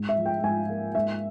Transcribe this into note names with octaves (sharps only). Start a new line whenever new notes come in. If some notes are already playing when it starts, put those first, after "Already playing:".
Already playing: G#2
E5
F3
G5
G#2 G#5
A#3
G#2 E5